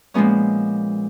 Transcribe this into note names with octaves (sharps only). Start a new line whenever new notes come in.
A#2 F3 G#3 B3 C#4